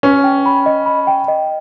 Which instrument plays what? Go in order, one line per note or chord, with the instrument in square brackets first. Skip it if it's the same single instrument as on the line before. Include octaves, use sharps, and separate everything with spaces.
[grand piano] C#4 [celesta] B4
[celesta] G5
B5
D#5
B5
G5
D#5